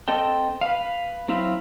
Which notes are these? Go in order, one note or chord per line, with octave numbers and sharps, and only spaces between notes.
C4 A4 D#5 G5
B4 F5
F#3 C4 E4 F5